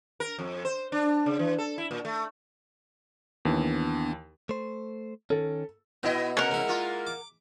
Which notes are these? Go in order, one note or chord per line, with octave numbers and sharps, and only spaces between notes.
A#4
F2
C5
D4
C#3
E3
A4
E4
A#2
A3
D#2 E3 B3 D4
A3 C5
D#3 C#4 A4
B2 B3 E4 D#5
C3 A#4 F#5
G#3 E4
A#3 F4
D6